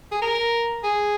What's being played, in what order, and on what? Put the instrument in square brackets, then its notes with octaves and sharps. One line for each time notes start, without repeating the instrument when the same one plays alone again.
[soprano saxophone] G#4
A#4
G#4